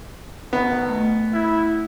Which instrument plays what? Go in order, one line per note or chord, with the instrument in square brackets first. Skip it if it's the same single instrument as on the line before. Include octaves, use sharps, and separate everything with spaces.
[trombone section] D2 B2 D#3 [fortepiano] B3
[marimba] A3
[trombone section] E4